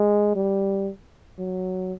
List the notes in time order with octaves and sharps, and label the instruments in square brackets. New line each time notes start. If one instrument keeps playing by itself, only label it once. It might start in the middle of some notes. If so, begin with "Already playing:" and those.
Already playing: [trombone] G#3
G3
F#3